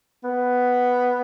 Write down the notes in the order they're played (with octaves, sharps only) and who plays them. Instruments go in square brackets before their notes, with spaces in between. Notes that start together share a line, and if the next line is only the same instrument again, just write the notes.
[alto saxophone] B3